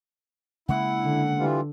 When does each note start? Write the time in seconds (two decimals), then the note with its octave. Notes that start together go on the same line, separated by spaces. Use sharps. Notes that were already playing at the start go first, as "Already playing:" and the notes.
0.69 C#3 G#3 A#3 E4 F#5
1.01 D3
1.38 E3 G3 F4